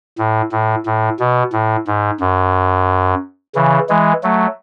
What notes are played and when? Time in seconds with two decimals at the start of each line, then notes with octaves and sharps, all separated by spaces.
0.18 A2
0.52 A2
0.86 A2
1.20 B2
1.53 A2
1.87 G#2
2.20 F#2
3.55 C#3 E3
3.89 E3 G#3
4.23 F#3 A3